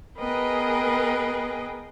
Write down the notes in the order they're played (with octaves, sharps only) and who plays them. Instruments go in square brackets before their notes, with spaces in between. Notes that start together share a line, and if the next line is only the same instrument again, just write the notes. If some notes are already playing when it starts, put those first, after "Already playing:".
[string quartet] B3 G#4 A#4 B4 D#5 G5